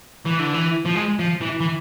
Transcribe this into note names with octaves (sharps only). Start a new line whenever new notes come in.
E3
D3
E3
F3
G#3
F3
E3
E3